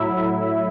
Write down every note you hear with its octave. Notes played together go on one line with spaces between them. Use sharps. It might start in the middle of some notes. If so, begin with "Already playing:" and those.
Already playing: A2 F#3 E4 E5